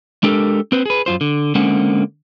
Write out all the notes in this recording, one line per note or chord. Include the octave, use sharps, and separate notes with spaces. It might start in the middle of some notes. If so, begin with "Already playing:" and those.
G#3 D4 G4 A4 A#4
C4 B4 C5
G#4 B4
F#2 F4 C5
D3
D3 G#3 A#3 C4 C#4 F#5